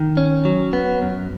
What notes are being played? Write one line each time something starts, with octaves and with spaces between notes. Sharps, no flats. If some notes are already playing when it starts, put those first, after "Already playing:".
Already playing: D#3
C#4
F#3
B3
F#2